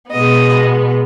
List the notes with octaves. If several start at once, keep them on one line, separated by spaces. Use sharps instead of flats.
B2 G#3 B3 D#5